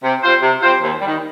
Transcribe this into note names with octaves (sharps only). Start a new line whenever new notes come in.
C3
G3 C4 F4 C5
C3
G3 C4 F4 C5
D#2
G3
D#3